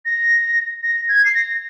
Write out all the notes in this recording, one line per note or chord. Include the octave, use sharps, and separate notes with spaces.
A#6
A#6
G#6
C7
A#6